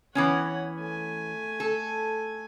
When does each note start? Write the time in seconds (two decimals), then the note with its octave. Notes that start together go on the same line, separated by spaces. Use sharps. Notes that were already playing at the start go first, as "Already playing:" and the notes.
0.15 E3 B3 C#4 C#5 F#5
0.77 A3 G#5
1.60 A4